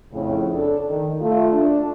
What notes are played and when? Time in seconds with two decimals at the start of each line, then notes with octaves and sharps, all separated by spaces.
0.12 F2 A2 C#3
0.50 D4 A4
0.89 D#3
1.21 A3 F4
1.52 D4